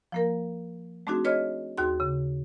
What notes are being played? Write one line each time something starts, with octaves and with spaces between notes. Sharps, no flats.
F3 A#3 A#4
A3 C4 D4 D#4 F#4 G#4
G#4 B4 C#5 D#5 F6 G#6
D#2 D#4 F#4 G#4 C6
C#3